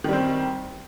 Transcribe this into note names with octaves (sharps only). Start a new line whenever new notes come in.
D#3 G3 C4